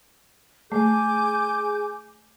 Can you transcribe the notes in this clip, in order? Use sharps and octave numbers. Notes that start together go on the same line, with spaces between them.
A3 G#4 G#5 D6 G6